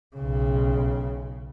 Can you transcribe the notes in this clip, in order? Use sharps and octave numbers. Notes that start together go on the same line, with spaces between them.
B1 C#3